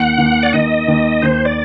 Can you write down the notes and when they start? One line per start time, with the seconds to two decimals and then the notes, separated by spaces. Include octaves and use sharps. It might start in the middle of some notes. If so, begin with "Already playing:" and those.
Already playing: D#2 F#5
0.18 D#2
0.43 D5
0.53 D#2 D#5
0.88 D#2
1.22 D#2 C5
1.45 D5